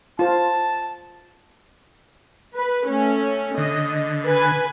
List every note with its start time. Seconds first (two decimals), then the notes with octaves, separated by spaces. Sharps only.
0.19 F4 C5 A5
2.56 B4
2.89 A3 C#4
3.58 D3 D#5
4.25 B4 G#5